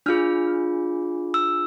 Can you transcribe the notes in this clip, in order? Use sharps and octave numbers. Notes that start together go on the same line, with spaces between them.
D4 F4 G#4 F6
E6